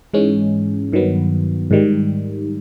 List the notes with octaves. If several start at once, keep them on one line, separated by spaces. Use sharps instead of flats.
G#2 E3 G#3 C#4
G2 D#3 F#3 B3
G#2 D#3 G3